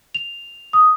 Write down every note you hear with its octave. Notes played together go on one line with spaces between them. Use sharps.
F7
D#6